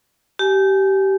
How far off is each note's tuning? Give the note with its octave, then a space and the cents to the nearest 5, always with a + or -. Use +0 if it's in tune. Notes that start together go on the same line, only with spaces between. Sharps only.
G4 -20 G#5 +15